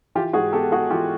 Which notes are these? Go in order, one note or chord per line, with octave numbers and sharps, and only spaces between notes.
E3 F4 G4
G#2 F#4 G#4
B3 G4 A4
G#3 F#4 G#4
E3 F4 G4